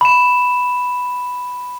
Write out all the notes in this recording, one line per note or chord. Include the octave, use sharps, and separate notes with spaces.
B5 E7